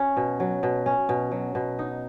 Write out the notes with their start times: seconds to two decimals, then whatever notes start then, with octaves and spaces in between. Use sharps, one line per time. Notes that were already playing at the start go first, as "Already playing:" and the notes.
Already playing: F#3 C#4
0.17 B2
0.40 F#3
0.63 B2
0.86 C#4
1.09 B2
1.32 F#3
1.55 B2
1.79 D#4